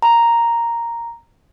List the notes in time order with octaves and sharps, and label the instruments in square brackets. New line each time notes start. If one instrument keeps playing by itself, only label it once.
[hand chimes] A#5